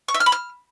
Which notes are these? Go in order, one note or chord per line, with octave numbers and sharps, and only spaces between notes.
C#6
E5
F6
B5
F6